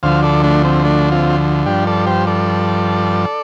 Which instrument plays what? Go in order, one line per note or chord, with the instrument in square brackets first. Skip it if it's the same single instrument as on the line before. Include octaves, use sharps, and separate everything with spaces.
[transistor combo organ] D2 D3 F3 C5 F5
A4 D5
A3 D4
C4
A3 D4
C4 F4
G2 F3 D4 G4
A4 D5
G4 C5
A4 D5